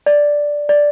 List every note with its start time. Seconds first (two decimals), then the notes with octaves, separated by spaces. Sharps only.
0.06 D5
0.69 D5